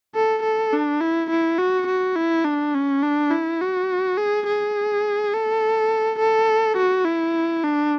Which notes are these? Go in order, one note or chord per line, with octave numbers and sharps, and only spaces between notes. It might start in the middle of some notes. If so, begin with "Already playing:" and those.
A4
A4
D4
E4
E4
F#4
F#4
E4
D4
C#4
D4
E4
F#4
G#4
G#4
A4
A4
F#4
E4
D4